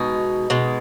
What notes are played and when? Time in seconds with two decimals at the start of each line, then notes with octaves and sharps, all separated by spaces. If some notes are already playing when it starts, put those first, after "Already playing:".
Already playing: B2 G#3 D#4
0.50 B2 G#3